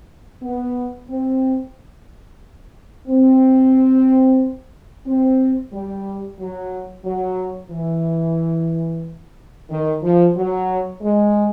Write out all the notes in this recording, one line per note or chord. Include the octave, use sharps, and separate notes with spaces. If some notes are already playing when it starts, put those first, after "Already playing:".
B3
C4
C4
C4
G3
F#3
F#3
E3
D#3
F3
F#3
G#3